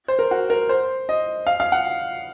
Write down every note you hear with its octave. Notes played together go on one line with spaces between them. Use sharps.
C5
A#4
F#4
A#4
C5
D#5
F5
F5
F#5